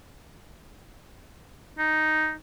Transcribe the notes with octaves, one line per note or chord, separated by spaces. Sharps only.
D#4